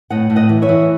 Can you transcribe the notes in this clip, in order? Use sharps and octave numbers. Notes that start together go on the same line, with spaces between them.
A2 D#5 F#5
A2
D#5 F#5
E3
C#5 E5
E3